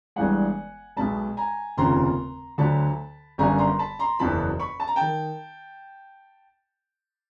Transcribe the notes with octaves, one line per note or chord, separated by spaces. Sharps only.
G1 G2 E3 G#3 F#5 G#5
B1 B2 G#3 A5 B5
G#5 A#5
F1 D#2 C#3 F3 A#5 C6
D2 D3 F#3 A5 B5
G1 F#2 D3 G3 G#5 A#5
A#5 C6
A5 B5
A#5 C6
F#1 E2 B2 F#3 A5 B5
B5 C#6
A5
A#5
D#3 G5 A5